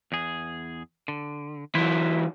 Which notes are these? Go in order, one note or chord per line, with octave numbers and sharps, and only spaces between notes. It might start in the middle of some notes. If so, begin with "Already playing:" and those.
E2 G#4
D3
E3 F#3 E4 C5